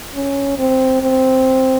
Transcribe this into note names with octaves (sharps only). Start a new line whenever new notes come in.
C#4
C4
C4